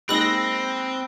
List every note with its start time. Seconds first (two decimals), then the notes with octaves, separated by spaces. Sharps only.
0.09 G#3 A#3 C4 D#4 B5 E6 F#6 A#6